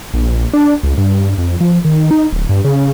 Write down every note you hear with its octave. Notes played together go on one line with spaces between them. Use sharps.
A#1
D4
C#2
G2
F2
F3
D#3
D#4
D1
G2
C#3